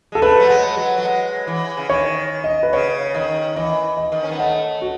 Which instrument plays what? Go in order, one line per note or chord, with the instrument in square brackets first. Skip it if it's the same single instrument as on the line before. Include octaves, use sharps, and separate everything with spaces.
[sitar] G#3 [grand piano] A4
[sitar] A3 [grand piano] B4
[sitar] F#3
G#3
F#3
F#3
G#3
E3
C#3
[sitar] D#3 [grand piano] C#5
[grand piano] D#5
B4
[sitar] C#3 [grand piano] C#5
[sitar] D#3 [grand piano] D#5
[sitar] E3 [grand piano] D#5
[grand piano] D#5
[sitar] D#3
C#4
B3
[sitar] A3 [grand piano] D#5
[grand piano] F#4